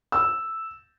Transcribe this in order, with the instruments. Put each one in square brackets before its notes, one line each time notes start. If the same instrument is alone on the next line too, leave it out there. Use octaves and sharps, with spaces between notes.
[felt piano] E6